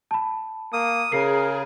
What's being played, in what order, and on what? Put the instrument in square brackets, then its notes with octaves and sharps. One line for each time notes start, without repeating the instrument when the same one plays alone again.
[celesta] A5 B5
[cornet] A#3 [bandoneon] D#6
[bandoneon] C#3 [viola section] G#4 [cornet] A#4 [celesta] C7